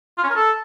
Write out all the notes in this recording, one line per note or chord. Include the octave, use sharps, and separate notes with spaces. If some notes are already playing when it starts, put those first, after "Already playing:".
F4
C#4
A#4
A4